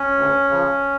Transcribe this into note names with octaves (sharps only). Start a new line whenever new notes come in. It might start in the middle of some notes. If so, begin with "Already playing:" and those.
Already playing: C#4
D2
C#3 F3